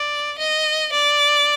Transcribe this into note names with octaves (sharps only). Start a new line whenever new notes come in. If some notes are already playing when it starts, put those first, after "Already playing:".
Already playing: D5
D#5
D5